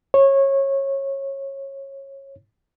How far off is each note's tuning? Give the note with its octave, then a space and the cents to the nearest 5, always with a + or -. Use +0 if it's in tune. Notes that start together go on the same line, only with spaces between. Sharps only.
C#5 -20